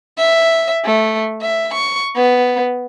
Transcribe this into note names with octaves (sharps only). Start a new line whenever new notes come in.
E5
A3
E5
C#6
B3